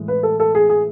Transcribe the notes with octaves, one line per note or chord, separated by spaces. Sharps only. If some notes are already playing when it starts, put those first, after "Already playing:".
Already playing: A2 E3 G#3
B4
A4
A4
G#4
G#4